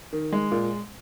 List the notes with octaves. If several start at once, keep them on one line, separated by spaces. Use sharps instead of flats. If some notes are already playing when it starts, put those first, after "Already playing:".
D#3
G#3
A#2